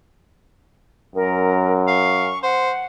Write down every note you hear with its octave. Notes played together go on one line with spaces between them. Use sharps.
F#2 A#4
F5 C#6
C5 F#5